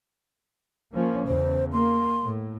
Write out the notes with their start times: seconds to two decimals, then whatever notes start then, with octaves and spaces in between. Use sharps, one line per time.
0.95 F3 A#3 C#4
1.28 E2 C#3 C5
1.73 A#3 C6
2.23 A2